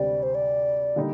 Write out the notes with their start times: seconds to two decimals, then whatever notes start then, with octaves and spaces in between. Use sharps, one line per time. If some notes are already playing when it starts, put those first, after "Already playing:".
Already playing: D2 C3 G3 C4 G4 D5
0.23 C5
0.35 D5
0.96 D3 G3 A#3 D#4